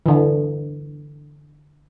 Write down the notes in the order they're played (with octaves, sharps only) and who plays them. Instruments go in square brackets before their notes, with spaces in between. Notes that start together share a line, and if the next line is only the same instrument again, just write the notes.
[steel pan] D3 E3